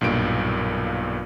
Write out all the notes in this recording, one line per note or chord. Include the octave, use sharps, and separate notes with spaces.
B1 G2 A#2 D7